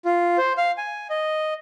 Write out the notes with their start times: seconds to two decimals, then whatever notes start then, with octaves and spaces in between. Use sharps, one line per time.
0.05 F4
0.38 C5
0.58 F5
0.78 G#5
1.10 D#5